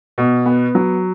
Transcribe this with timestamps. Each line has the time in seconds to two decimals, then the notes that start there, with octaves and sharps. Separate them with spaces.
0.18 B2
0.46 B3
0.75 F#3